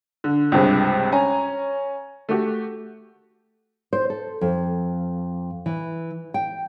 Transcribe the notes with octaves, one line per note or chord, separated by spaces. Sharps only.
D3
C#2 G2 C3 G#3
C#4 G#5 A#5
A3 F#4 G4
C5
A4
F2
E3
G5